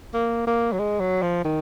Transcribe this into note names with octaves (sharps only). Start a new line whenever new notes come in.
A#3
A#3
F#3
G#3
F#3
F3
D#3